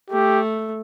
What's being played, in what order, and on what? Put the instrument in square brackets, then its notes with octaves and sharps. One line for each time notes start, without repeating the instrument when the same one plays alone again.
[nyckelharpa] A3 [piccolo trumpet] G4